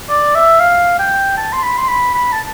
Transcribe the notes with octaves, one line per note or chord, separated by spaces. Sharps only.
D5
E5
F5
G5
A5
C6
B5
C6
B5
B5
A5